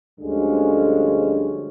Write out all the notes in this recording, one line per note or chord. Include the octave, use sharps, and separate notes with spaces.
D2 G2 D3 F3 G#3 C#4